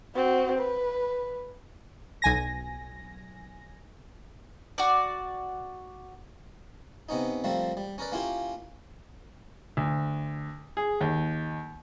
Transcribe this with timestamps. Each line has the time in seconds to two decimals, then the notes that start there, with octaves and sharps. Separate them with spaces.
0.16 C4 F#4
0.58 B4
2.22 B1 G#5 A#6
4.78 F#4 D5
7.09 C3 B3 C#4 D#4
7.44 F3 G3 A3 A#3 C4
7.77 G3
7.98 C#4 A#4 B4 D5
8.12 A#3 C#4 E4 F4 G4
9.77 D2
10.77 G#4
11.01 D#2